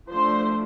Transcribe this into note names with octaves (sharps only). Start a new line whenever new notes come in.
F3 A3 D4 C5